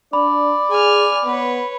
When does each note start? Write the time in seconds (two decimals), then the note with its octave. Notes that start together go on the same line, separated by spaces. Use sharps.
0.13 D4 D5 B5
0.70 G#4 G#5 F6
1.25 B3 B4 C#5